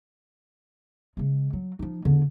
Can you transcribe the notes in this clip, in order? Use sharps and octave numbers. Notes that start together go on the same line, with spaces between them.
C#3 G#3
F#3
F3 D#4
E2 D3